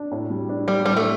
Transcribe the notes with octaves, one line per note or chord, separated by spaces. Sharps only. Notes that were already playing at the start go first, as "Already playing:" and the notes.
Already playing: D4
A2
G3
D4
G3 D4
A2 G3
A3